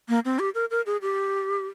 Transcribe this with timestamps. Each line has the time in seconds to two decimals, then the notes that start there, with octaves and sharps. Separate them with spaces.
0.09 A#3
0.25 C4
0.39 G4
0.55 A#4
0.71 A#4
0.86 G#4
1.02 G4